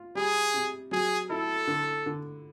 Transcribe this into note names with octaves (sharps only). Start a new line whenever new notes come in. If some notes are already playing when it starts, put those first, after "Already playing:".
Already playing: F4
G3 G#4
C3
F#3 G#4
E4 A4
D3
D3